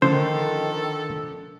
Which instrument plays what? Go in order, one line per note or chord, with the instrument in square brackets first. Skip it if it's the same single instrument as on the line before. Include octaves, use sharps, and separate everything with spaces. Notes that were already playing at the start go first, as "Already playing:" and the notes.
[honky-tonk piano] D3 F3 [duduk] D#3 [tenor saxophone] A4 [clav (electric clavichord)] C5